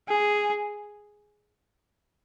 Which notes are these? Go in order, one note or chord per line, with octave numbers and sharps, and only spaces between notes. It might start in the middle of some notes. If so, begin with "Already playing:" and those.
G#4